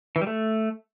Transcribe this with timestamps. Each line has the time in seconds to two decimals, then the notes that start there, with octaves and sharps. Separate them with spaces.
0.16 E3
0.21 G3
0.27 A3